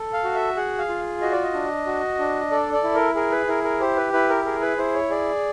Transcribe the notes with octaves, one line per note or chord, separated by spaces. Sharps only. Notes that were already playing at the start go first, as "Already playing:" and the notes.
Already playing: A4
F5
F#4
E5
G#4 F#5
F5
F4
F#4 D#5
D5
D#5
D4
F#4
D4
A4 D5
D5
E4
A#4
G#4 A#4
B4
E4 A#4
A#4
G4 C5
B4
E4 B4
A#4
G#4 A#4
B4
E4 C5
C#5
G#4 D5